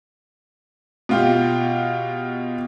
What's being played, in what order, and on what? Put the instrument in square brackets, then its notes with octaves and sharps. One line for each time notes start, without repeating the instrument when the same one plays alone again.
[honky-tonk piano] B2 F4 G4